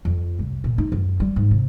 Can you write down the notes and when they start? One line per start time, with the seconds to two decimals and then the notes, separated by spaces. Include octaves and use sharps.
0.05 F2
0.39 C2
0.64 A#2
0.78 D#4
0.92 F#2
1.20 G3
1.36 G#2
1.51 C3